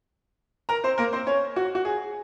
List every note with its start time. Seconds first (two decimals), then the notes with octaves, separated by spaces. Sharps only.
0.69 A#4 A#5
0.84 C4 C5
0.98 A#3 A#4
1.13 C4 C5
1.27 C#4 C#5
1.56 F#4
1.75 F#4
1.85 G#4